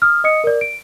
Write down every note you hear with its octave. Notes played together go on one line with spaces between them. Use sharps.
D#6 F6
D#5 D#6 C#7
A#4 D5
D7